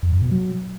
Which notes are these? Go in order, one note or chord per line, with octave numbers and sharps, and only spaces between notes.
F2
F#2
B2
F#3